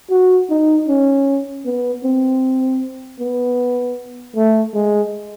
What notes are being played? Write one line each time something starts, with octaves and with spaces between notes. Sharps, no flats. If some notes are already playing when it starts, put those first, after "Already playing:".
F#4
D#4
C#4
B3
C4
B3
A3
G#3